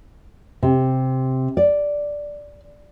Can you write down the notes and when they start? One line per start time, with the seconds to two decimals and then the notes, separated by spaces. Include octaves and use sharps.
0.63 C3
1.57 D5